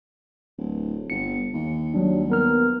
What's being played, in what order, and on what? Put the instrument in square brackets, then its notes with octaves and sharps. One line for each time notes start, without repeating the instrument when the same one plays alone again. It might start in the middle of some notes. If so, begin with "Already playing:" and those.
[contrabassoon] D1
[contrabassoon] G1 [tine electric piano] C#7
[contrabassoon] D#2
[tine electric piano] F#3 G3 D4
B3 A#4 F6